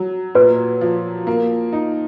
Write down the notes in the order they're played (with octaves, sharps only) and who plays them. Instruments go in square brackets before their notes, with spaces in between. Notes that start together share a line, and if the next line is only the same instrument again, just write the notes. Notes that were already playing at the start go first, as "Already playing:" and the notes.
Already playing: [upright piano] F#3
[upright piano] A#2 [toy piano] B4
[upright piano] F3
A#3
D#4